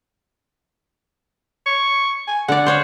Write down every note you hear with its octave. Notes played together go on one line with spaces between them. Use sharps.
C#6
G#5
D3 D5 F#5
C5 C#5 F5